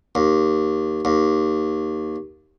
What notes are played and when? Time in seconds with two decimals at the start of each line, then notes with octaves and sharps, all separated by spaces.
0.15 D#2
1.05 D#2